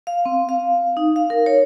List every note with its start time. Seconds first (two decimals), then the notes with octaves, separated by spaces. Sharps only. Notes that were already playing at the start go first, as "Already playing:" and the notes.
0.07 F5
0.25 C4
0.49 F5
0.97 D#4
1.16 F5
1.30 A#4
1.46 C#5